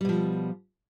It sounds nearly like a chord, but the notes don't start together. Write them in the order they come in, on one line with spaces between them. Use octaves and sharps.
G3 B2 F3